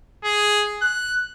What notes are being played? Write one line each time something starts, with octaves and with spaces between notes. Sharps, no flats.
G#4
F#6